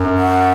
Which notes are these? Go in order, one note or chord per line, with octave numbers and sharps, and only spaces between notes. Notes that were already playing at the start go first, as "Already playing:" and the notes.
Already playing: F#2
F#5